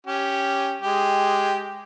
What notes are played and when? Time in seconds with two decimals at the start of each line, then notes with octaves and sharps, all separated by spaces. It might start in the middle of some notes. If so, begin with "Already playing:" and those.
0.07 C#4 G4
0.82 G#3 G4